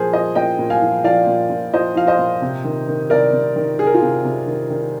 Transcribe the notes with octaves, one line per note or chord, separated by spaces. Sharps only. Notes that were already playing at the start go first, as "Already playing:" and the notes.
Already playing: A#2 F3 G#4 A#4 C5
F3 C5 D#5
A#2 D#5 G5
A#2
F5 G#5
F3
F3 D5 F5
A#2
A#2
F3 C5 D#5
F3 F5
C5 D#5
A#2
C3
D#3
D#3
C3 A#4 D5
C3
D#3
D#3 G#4
A#4
F4 G#4
C3
C3
D#3
D#3